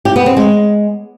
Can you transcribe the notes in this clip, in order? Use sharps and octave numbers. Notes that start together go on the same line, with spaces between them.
G4
B3
C4
G#3